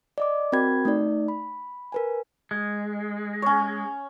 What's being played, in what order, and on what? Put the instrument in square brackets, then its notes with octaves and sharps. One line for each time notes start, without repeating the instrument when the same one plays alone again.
[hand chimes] D5 D#5 D6
C4 F#4 A#4 G5 B5 G#6
A3 D#4 D5
B5
A#4 B4 G#5
[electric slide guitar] G#3
[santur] C#4 C#5